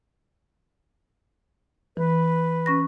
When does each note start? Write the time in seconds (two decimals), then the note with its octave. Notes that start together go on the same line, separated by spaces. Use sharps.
1.97 E3 B4
2.66 C#4 C#6 A#6